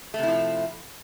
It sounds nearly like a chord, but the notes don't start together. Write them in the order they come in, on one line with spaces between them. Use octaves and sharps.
A3 C3 E4 F3